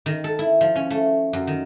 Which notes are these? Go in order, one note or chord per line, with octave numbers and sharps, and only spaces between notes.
D#3
A4
E4
F3
C#4
A3
F#2
D#3